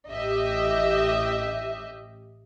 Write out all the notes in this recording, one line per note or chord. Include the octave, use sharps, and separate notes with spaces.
A1 G4 D#5 E5